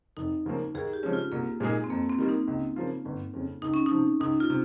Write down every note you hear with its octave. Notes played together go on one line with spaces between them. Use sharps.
F1 D#4
D#2 C#3 F3 A#3
D#2 G#4
G4
C#3 F3 G#3 C#4
F4
C2 A#3
A#2 G#3 D#4 G#4
C4
F2 A#3
C4
D#3 G3 A#3
D#4
C#2
C#3 F3 A#3 F4
G1
F2 C#3
C#2 D#4
C#4
D#4
C3 F3
C#2 D#4
F4
C3